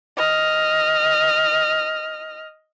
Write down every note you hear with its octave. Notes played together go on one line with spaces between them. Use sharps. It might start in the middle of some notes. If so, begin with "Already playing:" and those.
D#5 F6